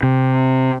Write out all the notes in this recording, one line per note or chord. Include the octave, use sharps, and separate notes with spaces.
C3